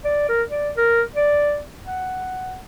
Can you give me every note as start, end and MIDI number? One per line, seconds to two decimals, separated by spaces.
0.05 0.25 74
0.29 0.42 70
0.50 0.70 74
0.77 1.02 70
1.16 1.59 74
1.86 2.57 78